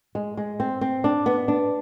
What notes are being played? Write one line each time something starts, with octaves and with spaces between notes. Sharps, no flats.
G#3
G#3
C4
C4
D4
B3
D4